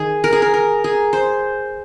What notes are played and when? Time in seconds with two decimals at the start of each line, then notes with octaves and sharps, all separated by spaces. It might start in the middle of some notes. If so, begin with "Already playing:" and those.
Already playing: D#3 G#4
0.24 A#4
0.33 G#4
0.42 A#4
0.54 A#4
0.84 G#4
1.13 C5